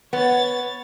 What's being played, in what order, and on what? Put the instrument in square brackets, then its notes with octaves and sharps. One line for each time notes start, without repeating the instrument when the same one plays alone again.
[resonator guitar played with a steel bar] B3 [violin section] C#5 A6